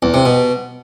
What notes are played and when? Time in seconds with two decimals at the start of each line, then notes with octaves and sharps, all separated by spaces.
0.02 E2
0.14 C3
0.25 B2